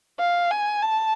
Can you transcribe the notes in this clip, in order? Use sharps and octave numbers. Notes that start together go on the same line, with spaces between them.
F5
G#5
A5